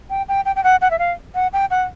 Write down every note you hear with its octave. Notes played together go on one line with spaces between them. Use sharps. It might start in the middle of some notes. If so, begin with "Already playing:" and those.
G5
G5
G5
G5
F#5
F#5
E5
F5
F#5
G5
F#5